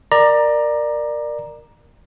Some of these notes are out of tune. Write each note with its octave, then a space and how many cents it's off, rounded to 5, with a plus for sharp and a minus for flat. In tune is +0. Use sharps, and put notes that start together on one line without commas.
A#4 +0 D5 +20 A#5 +10